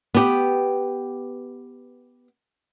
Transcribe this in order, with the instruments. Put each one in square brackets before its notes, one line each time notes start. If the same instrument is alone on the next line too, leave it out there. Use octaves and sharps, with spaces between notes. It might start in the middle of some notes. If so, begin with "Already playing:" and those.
[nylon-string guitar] B3 G4